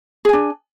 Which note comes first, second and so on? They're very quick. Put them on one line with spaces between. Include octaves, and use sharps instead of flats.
G#4 G#5 D4